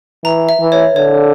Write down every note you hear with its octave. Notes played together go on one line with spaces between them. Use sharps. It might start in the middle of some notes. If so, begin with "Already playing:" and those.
E3 A#5
E5
E3
C#5
D3 C#5